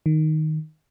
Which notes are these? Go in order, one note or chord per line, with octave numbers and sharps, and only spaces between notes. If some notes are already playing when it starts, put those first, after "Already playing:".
D#3